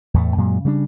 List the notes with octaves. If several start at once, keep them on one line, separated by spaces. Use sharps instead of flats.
E2 A2 A3
F#2 A#2 F#3 G#3
C#3 G3 G#3 D4